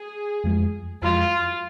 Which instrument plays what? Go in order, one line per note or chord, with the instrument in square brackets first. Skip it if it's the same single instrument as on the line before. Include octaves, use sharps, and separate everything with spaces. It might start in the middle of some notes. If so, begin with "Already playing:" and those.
Already playing: [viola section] G#4
[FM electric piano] F2 F3 G#3
[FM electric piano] F2 F3 G#3 [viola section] F4